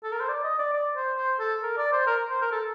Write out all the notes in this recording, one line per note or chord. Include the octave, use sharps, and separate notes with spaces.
A4
A#4
C5
D5
D#5
D5
D5
C5
C5
A4
A#4
D5
C5
A#4
C5
A#4
A4